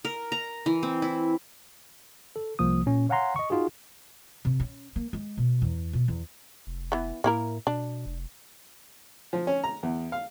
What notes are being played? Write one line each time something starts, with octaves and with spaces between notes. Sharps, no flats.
A#4
A#5
E3
C4
E4
A4
C2 F3 A#3 D#6
A#2 C#4
C#5 F5 F#5 G#5 A#5 C6
D#5 C#6
D#4 F4 F#4 G#4
C3
C#4
A#3
G#3
B2
E2
B2
E2
F1
E3 B3
A2 A#3 E4 A#4
B2 D4
F1
F3
C#4
A#5
E2
F5